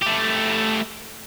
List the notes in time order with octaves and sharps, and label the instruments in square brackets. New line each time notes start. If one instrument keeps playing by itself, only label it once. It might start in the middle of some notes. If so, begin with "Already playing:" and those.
[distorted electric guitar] A3 G4